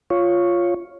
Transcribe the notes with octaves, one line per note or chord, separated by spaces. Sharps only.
F4 C#5